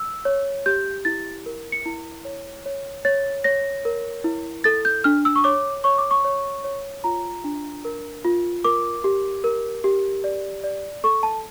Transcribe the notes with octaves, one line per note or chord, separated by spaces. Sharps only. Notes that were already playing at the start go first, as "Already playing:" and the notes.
Already playing: E6
C#5
G4 G6
E4 A6
A#4
C#7
E4
C#5
C#5
C#5 A6
C#5 A#6
A#4
E4
A4 A6
G6
D4 F6
E6
C#6
C#5 D6
C#5 C#6
D6
C#6
C#5
C#5
F4 A#5
D4
A#4
F4
A#4 D6
G4
A#4
G4
D5
D5
A4 C#6
A5